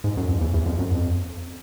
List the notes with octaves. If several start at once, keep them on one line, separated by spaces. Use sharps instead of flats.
G#2
F#2
F2
E2
E2
F2
F#2
F2